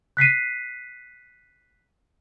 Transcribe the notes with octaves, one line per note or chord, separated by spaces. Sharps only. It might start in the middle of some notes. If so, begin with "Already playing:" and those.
F#6 B6 C7 D#7